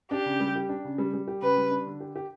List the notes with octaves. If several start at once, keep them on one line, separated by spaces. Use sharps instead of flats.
D4 G4
C#3
G3
G4
D4
C#3
G3
G3
G4
C#3 B4
G3
D4
D3
G4
G4